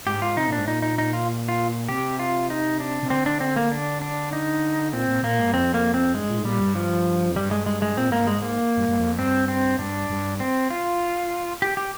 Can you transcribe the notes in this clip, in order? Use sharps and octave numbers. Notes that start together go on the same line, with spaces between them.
G#2 G4
F4
C3 D#4
A#2
D4
G#2
A#2 D#4
D#4
D#4
F4
F4
C3 G4
F4
D#4
D4
C3
D3 C4
D4
C4
A#3
D4
D4
D#4
A#2 C4
A#2
A#2 A#3
G#2
G2
F2 C4
A#3
C4
G2 G#3
A#2
G#2
A#2 G3
G2
F3
F2
G2 G3
G#3
G#3
G#3
A#2 C4
G#2 A#3
G2 G#3
G#2
A#3
G2
G2
F2
G2 C4
C4
G2 D4
G2
C4
F4
G4
G4